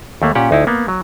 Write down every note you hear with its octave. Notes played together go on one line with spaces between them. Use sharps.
D#2 A3 A#3
A#2 C#4 G4 F#5
D2 D#4 E4
A#3 B3
F#3